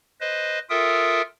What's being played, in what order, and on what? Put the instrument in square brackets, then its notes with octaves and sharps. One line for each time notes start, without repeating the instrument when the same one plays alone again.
[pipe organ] B4 C5 D#5
F4 A4 A#4 E5 G5 D#6